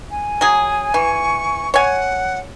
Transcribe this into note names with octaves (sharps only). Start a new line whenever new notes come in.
G#5
F#3 G#4
E3 C#6
C#5 F#5 G#5